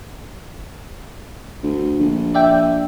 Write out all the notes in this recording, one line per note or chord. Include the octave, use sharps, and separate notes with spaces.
D2
A#1
D5 E5 G5